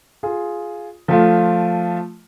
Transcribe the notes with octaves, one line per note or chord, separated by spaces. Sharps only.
F4 G#4
F3 A3 F4